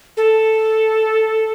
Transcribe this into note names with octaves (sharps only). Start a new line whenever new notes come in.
A4